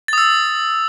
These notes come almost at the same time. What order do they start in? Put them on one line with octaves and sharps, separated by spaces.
A6 D#6 E6